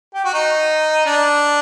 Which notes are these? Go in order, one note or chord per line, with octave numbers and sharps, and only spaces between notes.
G4
F#4
D#4
D4